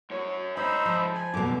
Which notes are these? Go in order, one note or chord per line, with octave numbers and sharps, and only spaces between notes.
F#2 C#5
C#2 D4 D#4 C5 E5 B5
F3
G#5
F#2 B2 D3 D6